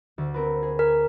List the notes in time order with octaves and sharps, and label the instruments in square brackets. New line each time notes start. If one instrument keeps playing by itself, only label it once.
[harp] D2
C4 A#4 B4
G#4
[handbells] A#4 [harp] G#5